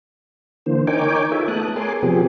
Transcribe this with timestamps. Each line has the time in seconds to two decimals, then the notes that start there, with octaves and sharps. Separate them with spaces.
0.66 D3 E3 A#3 C5
0.87 D#4 A#4 C#5 G5 G#5 D6
1.32 F4 G#4 A4 B4 E5
1.48 A3 B3 A5 D#6 F#6
1.76 G#4 A#4 C#5 G#5 C6 D6
2.03 C3 F3 B3 G4 G#4